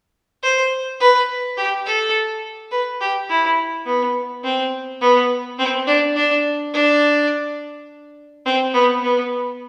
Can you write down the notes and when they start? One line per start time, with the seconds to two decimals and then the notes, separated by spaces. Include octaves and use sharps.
0.43 C5
1.00 B4
1.57 G4
1.86 A4
2.71 B4
3.01 G4
3.29 E4
3.86 B3
4.44 C4
5.01 B3
5.59 C4
5.87 D4
6.16 D4
6.74 D4
8.46 C4
8.74 B3
9.02 B3